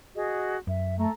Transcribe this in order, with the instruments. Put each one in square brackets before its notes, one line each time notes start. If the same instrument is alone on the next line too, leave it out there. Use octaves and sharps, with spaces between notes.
[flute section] F#4 G#4 D#5
[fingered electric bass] F#2 [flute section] E5
[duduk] A3 [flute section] A4 A#5